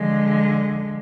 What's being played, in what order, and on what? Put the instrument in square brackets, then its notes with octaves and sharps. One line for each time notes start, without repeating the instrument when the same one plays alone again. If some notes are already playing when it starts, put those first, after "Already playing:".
Already playing: [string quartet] D3 F3 G#3